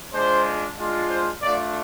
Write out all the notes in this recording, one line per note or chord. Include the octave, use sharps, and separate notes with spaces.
G#3 D4 F4 C5
G#3 D4 F4
C5
A3 D4 F4 D5